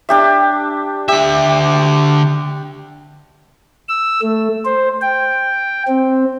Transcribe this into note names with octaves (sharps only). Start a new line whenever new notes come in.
D4 G4 E5
D3 G4 E5
E6
A3
C5
G5
C4